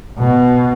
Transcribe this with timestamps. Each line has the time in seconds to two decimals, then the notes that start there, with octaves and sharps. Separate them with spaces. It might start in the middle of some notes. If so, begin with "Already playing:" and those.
0.19 B2